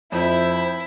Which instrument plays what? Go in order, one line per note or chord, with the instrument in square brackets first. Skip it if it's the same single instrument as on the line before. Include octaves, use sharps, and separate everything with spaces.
[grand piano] F2 [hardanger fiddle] E4 E5 [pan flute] C5